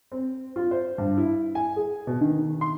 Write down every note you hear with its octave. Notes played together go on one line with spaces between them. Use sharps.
C4
F4
C5
G2
E4
G#5
G#4
B2
D#3
C6